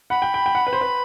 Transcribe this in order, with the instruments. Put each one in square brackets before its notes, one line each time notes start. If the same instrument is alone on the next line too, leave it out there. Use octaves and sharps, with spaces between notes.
[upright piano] F#5 [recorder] B5
[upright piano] G5
G5
G5
F#5
B4
C5
B4